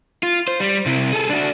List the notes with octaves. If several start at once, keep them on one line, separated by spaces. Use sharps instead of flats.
F4
C5
G3
C3 E4
G#4 A4
D4 F#4